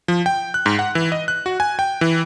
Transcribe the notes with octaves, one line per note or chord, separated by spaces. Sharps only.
F3
G5
F#6
G#2
F#5
E3
D#5
F#6
F#4
G#5
G5
E3